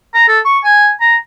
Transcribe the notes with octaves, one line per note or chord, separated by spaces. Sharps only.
A#5
A4
C#6
G#5
A#5